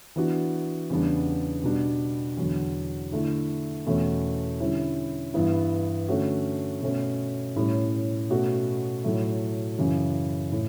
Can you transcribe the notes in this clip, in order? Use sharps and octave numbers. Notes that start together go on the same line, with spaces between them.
E3 B3 D4 F#4
E2 C#3 G3 B3 D4
B2 G3 D4
E2 D3 F#3
D3 A3 E4
E2 B2 A3 C#4
D3 G3 C#4 E4
G2 E3 B3 E4
D3 A3 C#4 F#4
B2 A3 C#4
A2 G3 C#4
B2 A3 C#4 F#4
A2 F#3 A3
F#2 C#3 E3
A2